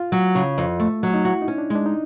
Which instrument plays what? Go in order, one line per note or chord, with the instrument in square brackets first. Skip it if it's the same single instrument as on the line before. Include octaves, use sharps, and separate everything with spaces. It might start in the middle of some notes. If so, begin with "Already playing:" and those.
Already playing: [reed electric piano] F4
[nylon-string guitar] F#3
C#3
F2
A3
F#3
[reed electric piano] D#4
[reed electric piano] E4 [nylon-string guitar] F#4
[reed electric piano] D#4
[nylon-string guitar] C#4
[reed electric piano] D4
[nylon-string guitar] G#3
[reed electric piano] D4
D#4